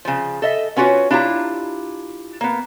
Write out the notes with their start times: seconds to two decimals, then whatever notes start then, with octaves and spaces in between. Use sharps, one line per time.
0.05 C#3 F3
0.42 A4 D#5 E5
0.76 B3 C#4 F4 F#4 B4 C#5
1.11 D4 E4 F4 G4 A#5
2.41 A#3 B3